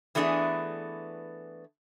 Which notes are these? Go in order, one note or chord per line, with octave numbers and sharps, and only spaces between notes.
E3 A3 B3 D4 G#4